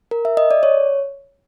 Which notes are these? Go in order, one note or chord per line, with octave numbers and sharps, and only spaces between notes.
A#4
E5
D#5
D5
C#5